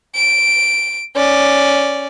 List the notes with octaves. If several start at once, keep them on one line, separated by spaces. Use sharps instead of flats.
D7
C#4 D5